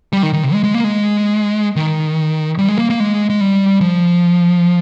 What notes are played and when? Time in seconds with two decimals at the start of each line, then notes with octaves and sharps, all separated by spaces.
0.13 G3
0.23 D#3
0.33 D#3
0.43 C3
0.53 G#3
0.64 G#3
0.74 A#3
0.84 G#3
1.76 D#3
2.58 G3
2.69 G#3
2.78 A#3
2.90 A#3
3.00 G#3
3.30 G#3
3.41 G3
3.81 F3